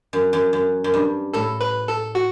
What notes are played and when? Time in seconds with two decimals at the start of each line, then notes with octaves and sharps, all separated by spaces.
0.13 F#2
0.33 F#2
0.53 F#2
0.84 F#2
0.94 G2
1.33 A2 A4
1.61 B4
1.88 A4
2.15 F#4